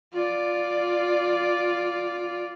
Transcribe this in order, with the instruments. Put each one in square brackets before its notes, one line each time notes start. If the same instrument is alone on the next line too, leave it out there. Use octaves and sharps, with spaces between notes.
[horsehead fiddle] F4 D5